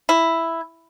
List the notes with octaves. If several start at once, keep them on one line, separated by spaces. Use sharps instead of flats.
E4